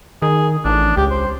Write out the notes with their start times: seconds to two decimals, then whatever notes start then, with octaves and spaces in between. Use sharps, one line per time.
0.22 D#3 G#4
0.65 A1 D4
0.97 C#2 G4
1.11 C5